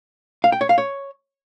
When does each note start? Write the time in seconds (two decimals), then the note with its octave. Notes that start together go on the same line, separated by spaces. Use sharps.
0.44 F5
0.52 G5
0.61 C#5
0.69 F5
0.78 C#5